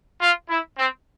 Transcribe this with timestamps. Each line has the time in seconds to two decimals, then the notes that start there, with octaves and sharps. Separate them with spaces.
0.21 F4
0.49 E4
0.78 C4